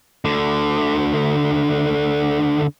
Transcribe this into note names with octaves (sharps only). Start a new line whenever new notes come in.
D2 D3